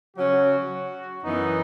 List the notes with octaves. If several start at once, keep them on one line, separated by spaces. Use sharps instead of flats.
C#3 F#3 C#4 F#4
F#2 E3 B3 D#4